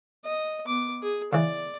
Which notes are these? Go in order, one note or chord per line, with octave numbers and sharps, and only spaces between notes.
D#5
B3 D6
G#4
C#3 E3 D5